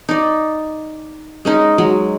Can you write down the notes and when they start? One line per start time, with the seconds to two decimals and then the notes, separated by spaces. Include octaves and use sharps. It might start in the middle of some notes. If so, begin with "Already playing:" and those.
0.09 D#4 D5
1.45 G#3 C#4 D#4
1.78 F#3 G#3